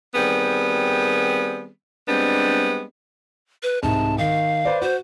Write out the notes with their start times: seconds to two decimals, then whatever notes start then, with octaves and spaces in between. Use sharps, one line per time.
0.15 D#3 G3 B3 C4 G#4
2.08 G3 G#3 B3 C4 D4
3.63 B4
3.83 C2 G#2 A5
4.18 D#3 F5
4.65 B4 C5 D5
4.82 F#4 C5